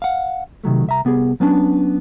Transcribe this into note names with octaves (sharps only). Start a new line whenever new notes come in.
F5 F#5
C3 D#3 F#3 A3
C2 E5 A#5
C2 B3 G4 G#4
F#3 B3 C#4 D4